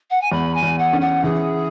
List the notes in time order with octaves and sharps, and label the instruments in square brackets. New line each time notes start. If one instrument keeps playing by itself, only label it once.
[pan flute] F#5
G#5
[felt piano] E2 [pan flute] B5
[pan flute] G#5
[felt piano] E2
[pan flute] F#5
[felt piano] C#4
[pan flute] F#5
[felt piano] E3 [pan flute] G#4